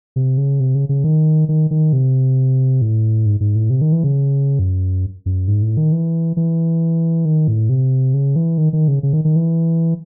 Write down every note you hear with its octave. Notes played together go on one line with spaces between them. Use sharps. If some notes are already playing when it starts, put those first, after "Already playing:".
C3
C#3
C3
C#3
C#3
D#3
D#3
D#3
C3
A2
G#2
G#2
A2
C3
D#3
E3
C#3
F#2
F#2
G#2
A2
D#3
E3
E3
D#3
A2
C3
C#3
E3
D#3
D#3
C#3
C#3
D#3
D#3
E3